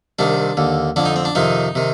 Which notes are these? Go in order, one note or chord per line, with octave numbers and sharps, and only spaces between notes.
C2 C3 D#3 D4
D#2 D3
F2 D3 D4
D#4
C4
D4
F2 C3 D#3 D#4
C3 D#3